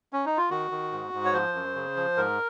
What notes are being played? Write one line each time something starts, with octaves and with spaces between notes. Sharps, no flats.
C#4
D#4
F4
D#3 F#4
D#3
G#2
G#2
C#5
F3 C5
F#2
C#3
F3
G#2 A#4